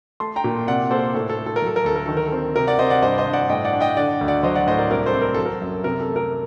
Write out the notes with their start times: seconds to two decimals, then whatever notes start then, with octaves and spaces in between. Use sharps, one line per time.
0.20 A3 A5 C6
0.36 G5 A#5
0.44 A#2
0.68 C3 D5 F#5
0.91 A#3 A4 C5
1.14 A2 A4
1.30 A4
1.37 A3
1.46 A4
1.56 A#4
1.62 F#3 A4
1.76 A#4
1.84 D2 A4
1.96 A#4
2.06 D#3 A4
2.17 A#4
2.26 A4
2.32 C4
2.56 C3 A#4
2.67 D5 F#5
2.79 C3 C5 D#5
2.90 D5 F#5
3.02 G2 C5 D#5
3.18 C5 D#5
3.26 G2
3.33 D5 F#5
3.49 A2 D#5 G5
3.65 D5 F#5
3.73 D4
3.80 D#5 G5
3.96 D3 D5 F#5
4.21 D2
4.28 D5 F#5
4.43 F#3 C5 D#5
4.55 D5 F#5
4.67 A2 C5 D#5
4.79 A#4 D5
4.91 C2 A#4 D5
5.06 A4 C5
5.14 C4
5.21 A#4
5.34 F#3 A4
5.46 A#4
5.61 F#2
5.84 C3 A#4
6.00 A4
6.08 A3
6.16 A#4